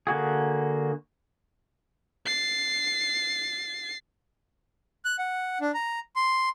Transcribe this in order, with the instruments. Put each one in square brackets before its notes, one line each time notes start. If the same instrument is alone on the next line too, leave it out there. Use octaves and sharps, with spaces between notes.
[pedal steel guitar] D3 A#3 F#4 G#4
[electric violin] A6 C7
[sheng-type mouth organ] F#6
F#5
D4
A#5
C6